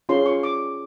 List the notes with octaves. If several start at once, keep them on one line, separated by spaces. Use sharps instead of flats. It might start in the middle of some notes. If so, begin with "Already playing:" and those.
C#4 F4 G#4 C#5 C6
C#6
D6